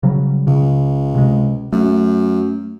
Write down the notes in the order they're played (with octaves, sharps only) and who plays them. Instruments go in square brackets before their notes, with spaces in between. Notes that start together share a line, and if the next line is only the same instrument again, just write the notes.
[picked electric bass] C#3 F#3 G3
[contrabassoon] C#2 [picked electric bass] C#3
[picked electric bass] C3 G#3
[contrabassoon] F#2 [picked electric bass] A3